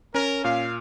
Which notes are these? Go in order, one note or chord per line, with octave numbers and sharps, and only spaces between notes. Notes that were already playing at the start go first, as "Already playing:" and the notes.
C#4 A#4
A#2 F5